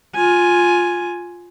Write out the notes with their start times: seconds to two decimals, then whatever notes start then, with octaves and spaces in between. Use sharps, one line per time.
0.15 F4 G#5